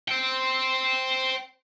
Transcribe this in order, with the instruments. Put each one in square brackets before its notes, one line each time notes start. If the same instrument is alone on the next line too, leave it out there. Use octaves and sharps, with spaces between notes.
[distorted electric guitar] C5 G5